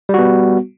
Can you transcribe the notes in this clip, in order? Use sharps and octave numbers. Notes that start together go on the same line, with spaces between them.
G3 B3 F#4